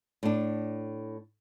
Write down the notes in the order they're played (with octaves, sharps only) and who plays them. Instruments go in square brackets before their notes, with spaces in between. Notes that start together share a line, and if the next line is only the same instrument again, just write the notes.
[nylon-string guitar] A2 D4